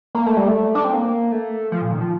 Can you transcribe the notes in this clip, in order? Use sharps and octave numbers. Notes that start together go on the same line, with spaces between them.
A#3
A3
G3
A3
D4
C4
A#3
A3
F3
A#2
D#3
F3